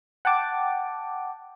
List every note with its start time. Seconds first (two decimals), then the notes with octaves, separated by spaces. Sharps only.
0.25 F#5 G5 A5 D6